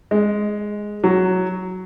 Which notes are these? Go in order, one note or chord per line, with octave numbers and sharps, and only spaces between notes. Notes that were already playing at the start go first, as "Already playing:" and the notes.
G#3
F#3